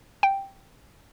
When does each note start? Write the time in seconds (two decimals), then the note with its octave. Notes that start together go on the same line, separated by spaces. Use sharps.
0.23 G5